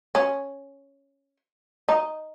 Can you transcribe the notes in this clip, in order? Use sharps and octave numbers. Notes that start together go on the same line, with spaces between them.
C#4
D#4